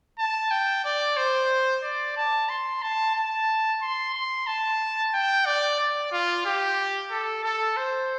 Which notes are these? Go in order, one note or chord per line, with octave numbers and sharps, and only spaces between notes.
A5
G5
D5
C5
D5
A5
C6
A5
A5
C6
C6
A5
G5
D5
D5
F4
G4
A4
A4
C5